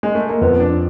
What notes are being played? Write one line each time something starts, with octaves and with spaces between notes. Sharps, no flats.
G#3
A3
A#3
F2 B3
D4